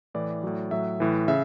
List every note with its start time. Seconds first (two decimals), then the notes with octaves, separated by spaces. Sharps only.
0.14 A2 E3 D5
0.43 A2 F#3
0.71 A2 F#3 E5
1.00 A2 E3
1.28 C#3 E5